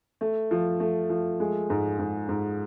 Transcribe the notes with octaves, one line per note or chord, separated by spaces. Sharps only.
A3
F3
A3
F3
G#3
G#2
G#2
G#2